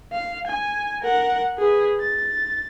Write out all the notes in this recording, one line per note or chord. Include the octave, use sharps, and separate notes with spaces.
F5
G#5
A#4 F#5
G#4 B4
A6